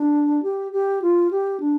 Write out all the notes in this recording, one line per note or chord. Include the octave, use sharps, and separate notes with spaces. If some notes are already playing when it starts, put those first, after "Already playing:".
Already playing: D4
G4
G4
F4
G4
D4